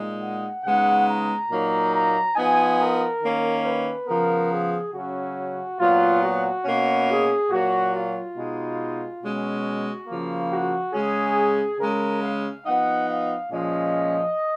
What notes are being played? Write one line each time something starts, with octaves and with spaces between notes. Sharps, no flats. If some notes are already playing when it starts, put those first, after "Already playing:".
Already playing: A#2 G#3 D#4
F#5
C#3 G#3 B3 D#4 F#5
A#5
A#2 F#3 A#3 D#4
A#5
F3 B3 D#4 G#5
A#4
D#3 A#3 C#4
B4
C#3 F3 B3 A#4
G#4
C#3 F#3 C#4 F#4
A#2 F#3 B3 F4
F#4
B2 A#3 C#4
G#4
A#2 F#3 A#3 F#4
F4
B2 G#3 D#4
B2 G#3 C#4 F#4
C#3 F3 A#3
F#4
C#3 G#3 C#4 G#4
C#3 G#3 C#4 A#4
F5
F3 B3 D#4 F#5
F5
A#2 F3 G#3 C#4 D#5